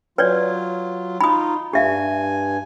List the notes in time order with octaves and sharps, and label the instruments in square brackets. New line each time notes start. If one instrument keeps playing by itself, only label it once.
[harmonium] F#3 F4 [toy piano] B4 C#5 D5
[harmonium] D#4 F4 [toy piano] B5 D#6
[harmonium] G2 G#5 [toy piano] G4 E5 F5